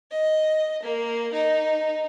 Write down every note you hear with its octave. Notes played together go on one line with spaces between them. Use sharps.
D#5
A#3
D#4